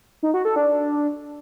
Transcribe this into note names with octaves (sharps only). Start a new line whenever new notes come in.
D#4
F#4
A4
D4